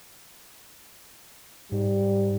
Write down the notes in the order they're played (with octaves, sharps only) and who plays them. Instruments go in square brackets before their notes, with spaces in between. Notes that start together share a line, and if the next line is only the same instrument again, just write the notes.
[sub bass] G#2 [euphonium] G3